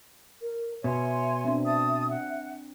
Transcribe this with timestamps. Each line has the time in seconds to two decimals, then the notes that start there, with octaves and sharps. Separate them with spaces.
0.42 A#4
0.84 B2 C#5 E5 G#5 C6
1.45 C4 D4
1.64 A5 D#6
2.09 F#5